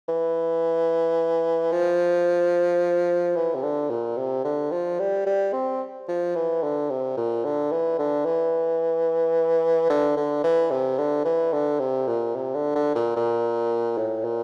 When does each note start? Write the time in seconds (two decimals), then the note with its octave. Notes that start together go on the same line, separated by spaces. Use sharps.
0.09 E3
1.72 F3
3.36 E3
3.55 C3
3.63 D3
3.90 A#2
4.17 C3
4.44 D3
4.72 F3
5.00 G3
5.27 G3
5.53 C4
6.09 F3
6.36 E3
6.63 D3
6.90 C3
7.17 A#2
7.45 D3
7.72 E3
7.99 D3
8.25 E3
9.90 D3
10.17 D3
10.44 E3
10.71 C3
10.98 D3
11.25 E3
11.53 D3
11.79 C3
12.07 A#2
12.35 C3
12.54 D3
12.76 D3
12.95 A#2
13.16 A#2
13.98 A2
14.25 A#2